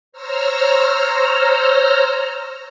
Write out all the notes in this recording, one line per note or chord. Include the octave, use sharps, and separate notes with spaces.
C5 C#5 A#5 E6 F6